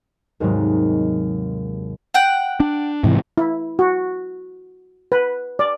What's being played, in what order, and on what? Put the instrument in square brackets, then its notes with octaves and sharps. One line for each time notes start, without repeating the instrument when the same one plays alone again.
[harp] D#2 G#2 C3 D#3 F#3 G#3
[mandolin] F#5 G5
[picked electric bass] D4
G#2 C3 E3
[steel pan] E4
F#4
B4
D5